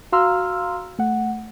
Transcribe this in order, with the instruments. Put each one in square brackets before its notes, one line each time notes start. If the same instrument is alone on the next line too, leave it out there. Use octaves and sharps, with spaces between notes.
[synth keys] F#4 F5 A#5 C6 E6 F6
A3 F#5